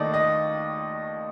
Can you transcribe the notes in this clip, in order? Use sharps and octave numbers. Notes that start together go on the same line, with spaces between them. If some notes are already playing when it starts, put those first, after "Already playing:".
Already playing: D#2 D#3 A3 D5 D#5
D#5